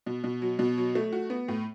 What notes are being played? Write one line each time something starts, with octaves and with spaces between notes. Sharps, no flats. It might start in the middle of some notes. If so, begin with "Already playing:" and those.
B2
B2
F#3
B2
F#3
A3
F#4
B3
A2